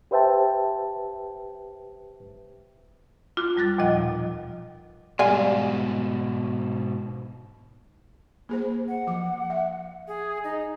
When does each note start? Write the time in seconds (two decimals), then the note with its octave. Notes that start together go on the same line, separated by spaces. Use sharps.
0.11 G4 B4 C5 E5 G5 A5
3.37 F4 D6 F#6
3.56 F2 G3 F#6 A6
3.78 D#2 A#2 F3 D#5 F#5
3.97 B2
5.19 G#2 B2 G3 F5 G#5
8.49 A#3 G#4 C5
8.88 F#5
9.07 F3 D6
9.50 E5
10.07 G#4
10.44 D#4